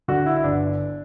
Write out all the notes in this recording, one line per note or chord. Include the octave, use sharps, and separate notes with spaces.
D3 F#4
E4
E4
G1 D4